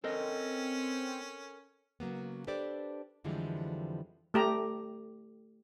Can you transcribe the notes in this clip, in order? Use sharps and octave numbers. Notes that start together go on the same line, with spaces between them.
C4 C#4 A4 A#4 D#5
C#3 F#3 A#3 B3
D4 G4 A4 B4 C5 D5
F2 D3 E3 F3 G3 G#3
A3 G4 A#5